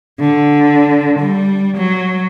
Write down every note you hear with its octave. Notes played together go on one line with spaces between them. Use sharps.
D3
G3
F#3